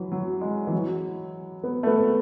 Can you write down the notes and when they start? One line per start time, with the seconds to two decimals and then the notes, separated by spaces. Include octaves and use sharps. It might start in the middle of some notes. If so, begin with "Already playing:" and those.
Already playing: E3 F#3
0.12 F#3
0.41 G#3
0.67 E3
0.72 F#3
1.64 B3
1.83 A3
1.87 B3